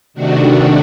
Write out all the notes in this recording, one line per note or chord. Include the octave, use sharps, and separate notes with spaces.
C3 D#3 A3 D4 F#4